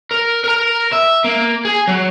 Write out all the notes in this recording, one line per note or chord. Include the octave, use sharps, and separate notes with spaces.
A#4
A#4 A#5
E5
A#3
G#4
F#3